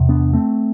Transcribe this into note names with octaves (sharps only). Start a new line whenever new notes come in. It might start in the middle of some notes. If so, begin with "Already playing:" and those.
Already playing: E2 C3
B3 D4
A3 C4